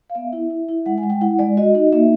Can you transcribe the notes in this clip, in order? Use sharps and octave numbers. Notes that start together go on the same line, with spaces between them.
F5
B3 E5
E4
E4
E4
G#3 F#5
G#5
G#3
G5
E4 F#5
G#3 D5
F#4 D#5
D#4
A#3 E5